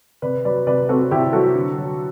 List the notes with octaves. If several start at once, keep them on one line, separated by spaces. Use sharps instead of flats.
C3 B4 D5
F#3 B4 D5
C3 B4 D5
C4 F#4 A4
C3 E4 G4
F#3 F#4 A4
D3
F#3